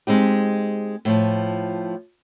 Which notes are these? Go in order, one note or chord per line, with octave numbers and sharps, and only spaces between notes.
G#3 C4 D#4 G4
A2 F3